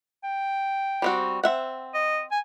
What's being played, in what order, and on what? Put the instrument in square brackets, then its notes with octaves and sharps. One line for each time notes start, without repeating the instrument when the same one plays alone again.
[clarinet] G5
[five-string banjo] G3 C4 F#4
C4 E5 F#5
[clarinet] D#5
G#5